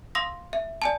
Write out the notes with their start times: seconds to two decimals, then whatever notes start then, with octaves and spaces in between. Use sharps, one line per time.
0.15 F5 C6 D#6 E6 A#6
0.53 E5
0.82 D5 G#5 A5